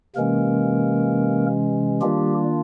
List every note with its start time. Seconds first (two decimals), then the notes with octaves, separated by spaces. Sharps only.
0.15 C3 E3 G#3 A#3 C#4 A#4
2.01 D#3 G3 A#3 D4 F4 G4